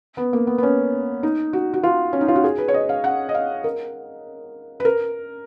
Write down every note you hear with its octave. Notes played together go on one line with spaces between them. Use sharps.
B3
A#3
B3
B3
C#4
D#4
F#4
F#4
F4
C#4
D#4
F4
F#4
G#4
B4
C#5
D#5
F5
F#5
D#5
F5
A#4
B4
A#4